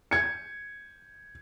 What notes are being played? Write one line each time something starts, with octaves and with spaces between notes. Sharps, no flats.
G#6 C#7